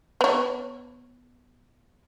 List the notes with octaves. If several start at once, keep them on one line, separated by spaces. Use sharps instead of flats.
B3 C#5